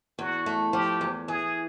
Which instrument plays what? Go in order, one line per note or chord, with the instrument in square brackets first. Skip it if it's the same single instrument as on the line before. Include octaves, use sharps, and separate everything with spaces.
[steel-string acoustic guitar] E2 [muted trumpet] F#4
[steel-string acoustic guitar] A3
[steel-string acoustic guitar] F3 [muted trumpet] G4
[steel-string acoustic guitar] E2
[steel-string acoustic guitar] E3 [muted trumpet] G#4